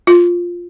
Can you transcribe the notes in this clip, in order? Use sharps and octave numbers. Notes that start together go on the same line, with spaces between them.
F4